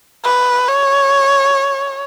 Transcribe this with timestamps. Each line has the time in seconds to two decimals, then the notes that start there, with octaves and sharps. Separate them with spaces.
0.25 B4
0.68 C#5